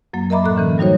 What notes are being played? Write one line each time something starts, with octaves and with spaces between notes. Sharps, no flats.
F#2 F#3 A#3
A#4 D#5 E5 A#5 B5 D6
A2 A4 F#6
D3 E3 C#4
F#3 G3 D#4 F#4 C5 C#5